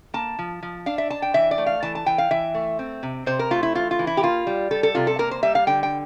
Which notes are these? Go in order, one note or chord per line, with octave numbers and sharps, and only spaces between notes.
A#3 A5
F3
F3
D4 F5
E5
D4 A5
G5
E3 E5
D5
A3
F5
E3 A5
A5
E3 G5
F5
E3 E5
A3
C4
C3
C3 C5
A#4
A3 F4
E4
E3 F4
F4
E3
E4
G4
A#3 F4
G3
G3 A4
A4
C3 F4
A4
A#3 A#4
C5
G3 E5
F5
D3 G5
G5